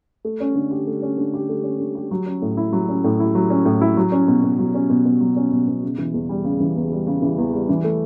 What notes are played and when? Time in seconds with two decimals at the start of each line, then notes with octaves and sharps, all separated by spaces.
0.25 A3
0.40 C#4
0.55 D3
0.71 G4
0.87 A3
1.02 C#4
1.18 D3
1.34 G4
1.49 A3
1.64 C#4
1.80 D3
1.95 G4
2.11 F#3
2.26 C#4
2.42 A2
2.57 E4
2.73 F#3
2.89 C#4
3.04 A2
3.20 E4
3.35 F#3
3.50 C#4
3.65 A2
3.81 E4
3.97 F#3
4.12 C#4
4.28 B2
4.43 B2
4.59 F#3
4.74 C#4
4.90 B2
5.05 B2
5.20 F#3
5.36 C#4
5.51 B2
5.68 B2
5.83 C#3
5.98 E3
6.14 E2
6.29 G3
6.44 C#3
6.60 E3
6.76 E2
6.92 G3
7.07 C#3
7.22 E3
7.38 E2
7.53 G3
7.69 E3
7.84 A3